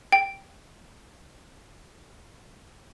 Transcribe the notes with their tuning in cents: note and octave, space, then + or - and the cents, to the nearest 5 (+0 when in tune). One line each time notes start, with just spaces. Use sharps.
G5 -5